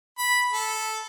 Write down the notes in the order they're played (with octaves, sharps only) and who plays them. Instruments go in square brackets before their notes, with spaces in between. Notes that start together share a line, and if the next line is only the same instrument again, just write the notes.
[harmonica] B5
A4